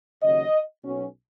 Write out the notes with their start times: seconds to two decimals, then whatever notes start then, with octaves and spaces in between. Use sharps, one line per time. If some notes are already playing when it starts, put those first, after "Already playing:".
0.23 D#2 C#3 F#3 D#5
0.83 B1 B2 F#3 C#4